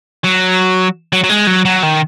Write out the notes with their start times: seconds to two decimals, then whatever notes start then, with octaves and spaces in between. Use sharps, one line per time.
0.24 F#3
1.13 F#3
1.24 F#3
1.29 G#3
1.47 F#3
1.65 F#3
1.83 D#3